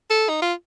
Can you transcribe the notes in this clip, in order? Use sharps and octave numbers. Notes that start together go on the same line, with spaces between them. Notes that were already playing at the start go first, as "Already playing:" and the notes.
A4
D#4
F4